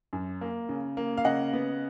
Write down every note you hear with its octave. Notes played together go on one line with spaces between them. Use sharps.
F#2
A#3
C#3
A#3
F5
C#3 D#5 F#5
B3